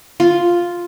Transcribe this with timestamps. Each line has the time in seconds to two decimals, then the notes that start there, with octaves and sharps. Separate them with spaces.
0.20 F4